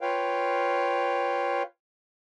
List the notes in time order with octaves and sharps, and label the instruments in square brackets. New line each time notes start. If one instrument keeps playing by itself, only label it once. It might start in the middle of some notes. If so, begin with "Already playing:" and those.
[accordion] F4 B4 C#5 F5 G5